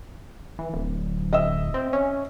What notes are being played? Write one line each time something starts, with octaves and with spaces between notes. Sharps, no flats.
E3
D1
D#5 E5 E6
C4
C#4